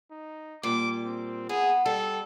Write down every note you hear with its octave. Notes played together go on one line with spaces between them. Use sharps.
D#4
A#2 G3 D6
C4
B3 G#4
G3 A4